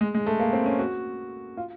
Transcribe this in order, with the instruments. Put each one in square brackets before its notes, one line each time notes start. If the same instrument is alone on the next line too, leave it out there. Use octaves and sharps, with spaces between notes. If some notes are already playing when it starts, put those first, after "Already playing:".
[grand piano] G#3
G#3
A3
A#3
C4
C#4
F#4
F4